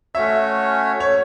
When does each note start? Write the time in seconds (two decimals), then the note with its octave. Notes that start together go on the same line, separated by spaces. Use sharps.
0.15 A3 C#4 F#4 C#5 E5
1.00 C#5